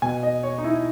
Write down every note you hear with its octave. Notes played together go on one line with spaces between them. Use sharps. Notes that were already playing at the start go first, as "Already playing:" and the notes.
B2 G#5
D#5
C#5
D#4
E4